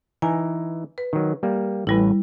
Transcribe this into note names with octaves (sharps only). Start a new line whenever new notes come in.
E3 D#4 G#5 A#5
B4
D#3 F#3
G3 A#3
A1 G3 E4 B4